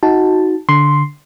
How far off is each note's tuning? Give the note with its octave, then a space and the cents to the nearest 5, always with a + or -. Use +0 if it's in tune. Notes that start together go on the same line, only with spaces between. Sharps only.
D#4 +25 F#4 +0 A5 +0
D3 -10 C6 +0